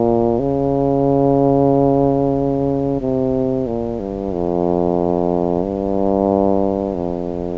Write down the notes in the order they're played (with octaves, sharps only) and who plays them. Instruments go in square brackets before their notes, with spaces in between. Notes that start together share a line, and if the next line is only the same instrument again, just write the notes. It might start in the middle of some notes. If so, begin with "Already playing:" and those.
Already playing: [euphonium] A#2
C#3
C3
A#2
G2
F2
G2
F2